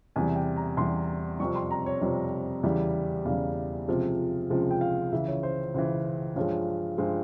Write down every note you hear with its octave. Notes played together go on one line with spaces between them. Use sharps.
E2 C3 E3 G3 G#5
G5
A#5
E2 C3 E3 G3 C6
F2 C3 G3 C#6
C6
A#5
C#5
F2 C3 G3 C#5
E2 C#3 E3 G3
E2 C#3 E3 G3 F5
C#2 C3 F3 G#3
C#2 C3 F3 G#3
G5
F5
C#2 C#3 E3 E5
C#5
C5
C#2 C#3 E3 C5
G2 F3 G#3 C#5
G2 F3 G#3 C5